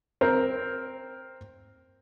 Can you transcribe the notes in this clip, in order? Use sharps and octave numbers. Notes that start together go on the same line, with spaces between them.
C4 A#4